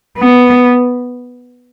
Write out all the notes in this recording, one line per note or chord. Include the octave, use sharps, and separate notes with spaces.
B3